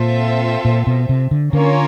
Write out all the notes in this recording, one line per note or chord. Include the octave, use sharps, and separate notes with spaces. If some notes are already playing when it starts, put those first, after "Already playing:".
Already playing: A#2 C4 F4 A4 C5 E5
A#2
B2
C3
D3
D3 A#3 C#4 F4 A#4 C#5